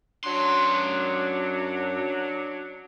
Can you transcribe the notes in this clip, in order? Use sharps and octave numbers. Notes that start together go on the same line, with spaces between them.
F#2 F#3 D4 C6